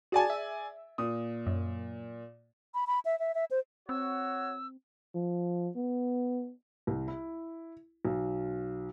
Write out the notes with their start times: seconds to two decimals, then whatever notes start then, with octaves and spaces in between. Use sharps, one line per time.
0.12 F#4 G#4 D5 G#5 A5
0.30 E5
0.98 A#2 D#6
1.47 F#2
2.74 B5
2.87 B5
3.05 E5
3.20 E5
3.35 E5
3.51 C5
3.89 C4 F#4 C#5 E6
5.15 F3
5.76 B3
6.87 C2
7.08 E4
8.05 B1